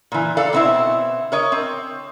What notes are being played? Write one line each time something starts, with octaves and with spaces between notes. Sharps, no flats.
A#2 E3
A4 D5 F5
B2 C4 E4
A#4 C#5 D#5
C4